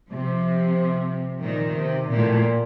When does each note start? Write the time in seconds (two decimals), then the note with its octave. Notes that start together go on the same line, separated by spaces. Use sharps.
0.10 C3 F3
1.42 A#2 D#3
1.76 C3
2.09 A#2